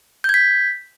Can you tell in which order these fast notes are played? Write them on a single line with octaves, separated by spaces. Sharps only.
G6 G#6 B6